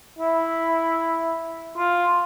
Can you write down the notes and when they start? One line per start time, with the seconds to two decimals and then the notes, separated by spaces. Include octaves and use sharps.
0.19 E4
1.78 F4